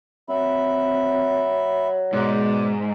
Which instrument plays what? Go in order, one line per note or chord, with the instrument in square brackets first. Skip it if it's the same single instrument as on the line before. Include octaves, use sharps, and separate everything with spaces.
[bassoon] F#3 [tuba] C4 [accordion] E5 B5
[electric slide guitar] G#2 [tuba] B2 [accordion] D5